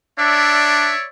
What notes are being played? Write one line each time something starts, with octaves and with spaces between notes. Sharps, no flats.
D4 C#5 D5 E5